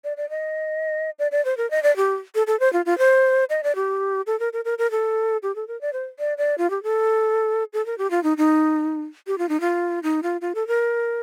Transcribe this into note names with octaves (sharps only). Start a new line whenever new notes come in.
D5
D5
D#5
D5
D5
C5
A#4
D#5
D5
G4
A4
A4
C5
F4
F4
C5
D#5
D5
G4
A4
A#4
A#4
A#4
A#4
A4
G4
A4
A#4
D5
C5
D5
D5
F4
G4
A4
A4
A#4
G4
F4
D#4
D#4
G4
F4
D#4
F4
D#4
F4
F4
A4
A#4